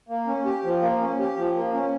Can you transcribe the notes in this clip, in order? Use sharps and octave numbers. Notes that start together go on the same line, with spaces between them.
A#3
C#4
G4
F3
A#3
C#4
G4
F3
A#3
C#4